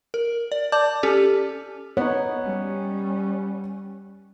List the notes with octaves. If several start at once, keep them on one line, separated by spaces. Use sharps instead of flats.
A#4
D5
D5 A5 D6 G6
C#4 G4 A4
B3 D#4 C#5
G3 C#4